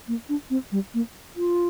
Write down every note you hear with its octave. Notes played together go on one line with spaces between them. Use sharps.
A#3
D4
C4
G3
A#3
F4